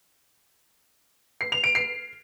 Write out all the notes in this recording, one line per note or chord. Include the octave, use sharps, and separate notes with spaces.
C7
F7
D7
C7